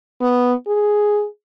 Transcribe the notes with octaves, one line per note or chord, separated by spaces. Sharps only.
B3
G#4